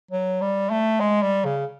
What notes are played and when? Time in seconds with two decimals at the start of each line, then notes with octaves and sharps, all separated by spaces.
0.11 F#3
0.41 G3
0.70 A3
1.00 G#3
1.22 G3
1.45 C#3